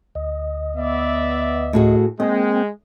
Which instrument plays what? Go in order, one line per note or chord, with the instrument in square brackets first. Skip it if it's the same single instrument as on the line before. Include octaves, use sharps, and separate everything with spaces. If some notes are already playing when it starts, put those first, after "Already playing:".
[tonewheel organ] D2 D#5
[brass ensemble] B3 D5 E5
[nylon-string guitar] A2 F#4 G#4
[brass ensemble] G#3 [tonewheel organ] A#3 C4 G5 [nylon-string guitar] D#5